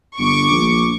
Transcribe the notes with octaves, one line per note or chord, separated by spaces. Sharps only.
G1 C#6 D6
A#1